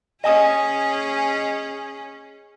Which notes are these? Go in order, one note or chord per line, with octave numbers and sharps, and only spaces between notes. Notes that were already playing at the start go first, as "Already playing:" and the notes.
C#4 G#4 D#5 G#5 D#6